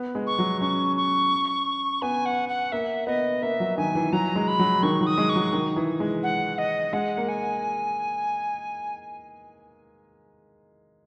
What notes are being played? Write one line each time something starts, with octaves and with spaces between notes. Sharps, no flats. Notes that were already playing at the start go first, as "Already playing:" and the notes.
Already playing: B3
G#3
C#6
F#3
C#4 C#6
C#6
B3 G#5
F#5
F#5
A#3 E5
B3 D#5
A#3 E5
F#3
D#3 G#5
E3
F#3 A#5
G#3
B5
F#3
D#3 C#6
F#3
D#6
G#3
C#6
F#3
D#3
E3
G#3
F#5
D#5
G#3 F#5
A#3
G#5